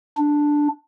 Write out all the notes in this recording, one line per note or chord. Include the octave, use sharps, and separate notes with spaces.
D4